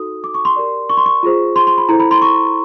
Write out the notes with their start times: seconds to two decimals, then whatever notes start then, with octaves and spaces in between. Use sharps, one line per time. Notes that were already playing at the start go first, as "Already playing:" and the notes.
Already playing: D#4 F#4 A4 D#6
0.24 D6
0.34 C#6
0.45 C6
0.56 G4 A#4 D5
0.90 C#6
0.97 C6
1.06 C#6
1.23 F4 G#4 C5
1.56 C6
1.67 C6
1.78 B5
1.88 E4 A4 C5 A#5
2.00 B5
2.11 C6
2.22 C#6